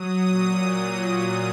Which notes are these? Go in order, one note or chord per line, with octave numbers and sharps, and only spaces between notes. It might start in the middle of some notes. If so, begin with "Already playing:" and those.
Already playing: F#3 D#6
A#2 F#3